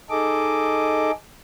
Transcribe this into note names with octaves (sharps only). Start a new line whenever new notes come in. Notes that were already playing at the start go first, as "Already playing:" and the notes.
D#4 G#4 A4 D#5 D6